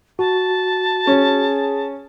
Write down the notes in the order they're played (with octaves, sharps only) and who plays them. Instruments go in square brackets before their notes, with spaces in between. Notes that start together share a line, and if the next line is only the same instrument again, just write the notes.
[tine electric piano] F#4 [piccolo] A5
[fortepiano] C#4 [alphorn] G#4